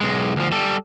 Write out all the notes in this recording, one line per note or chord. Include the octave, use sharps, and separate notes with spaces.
B1 G#3
D2 F3
G3 A4